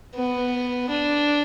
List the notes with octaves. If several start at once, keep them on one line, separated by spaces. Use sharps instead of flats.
B3
D4